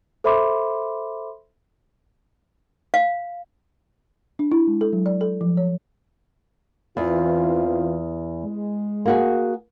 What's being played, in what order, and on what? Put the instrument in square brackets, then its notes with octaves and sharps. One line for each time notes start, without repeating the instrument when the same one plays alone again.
[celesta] A4 C5 E5 B5 C6 D6
[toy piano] F5
[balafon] D4
E4
G#3
A4
F#3
D5
A4
F3
C#5
[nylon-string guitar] E2 [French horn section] E3 C4 F4
[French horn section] G#3
[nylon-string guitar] A#3 F#4 G#4